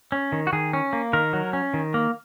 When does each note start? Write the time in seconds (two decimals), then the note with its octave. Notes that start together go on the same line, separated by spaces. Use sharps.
0.12 C#4
0.32 D#3
0.47 F#4
0.53 D#3 G#4
0.73 C#4
0.93 A#3
1.13 D#3 A#4
1.33 F#3
1.53 C#4
1.74 D#3
1.94 A#3